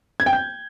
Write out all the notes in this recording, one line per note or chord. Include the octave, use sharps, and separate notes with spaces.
G#6
G5
G6